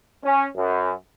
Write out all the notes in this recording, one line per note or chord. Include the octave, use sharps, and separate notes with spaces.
C#4
F#2